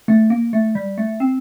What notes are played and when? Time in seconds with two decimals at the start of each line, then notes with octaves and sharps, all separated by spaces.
0.08 A3
0.30 A#3
0.53 A3
0.75 G3
0.98 A3
1.20 C4